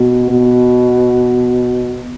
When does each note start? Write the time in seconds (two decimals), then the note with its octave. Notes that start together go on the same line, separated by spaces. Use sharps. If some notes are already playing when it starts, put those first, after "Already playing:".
Already playing: B2
0.30 B2